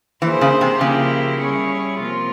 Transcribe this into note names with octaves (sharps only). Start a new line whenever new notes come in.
E3 A#3 E4 G#4 C5
C#3
C3
C#3 F3 A#3 E4 G4
G3 C#4 E4 G#4 C#5
C3 F3 A#3 F4